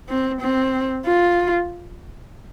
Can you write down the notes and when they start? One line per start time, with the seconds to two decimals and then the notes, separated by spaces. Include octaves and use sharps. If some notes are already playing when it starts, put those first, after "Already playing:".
0.09 C4
0.41 C4
1.06 F4